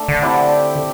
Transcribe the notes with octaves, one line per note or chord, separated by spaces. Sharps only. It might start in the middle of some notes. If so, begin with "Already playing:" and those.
Already playing: A3 D4 A4
D3
C4 E4 G4 D5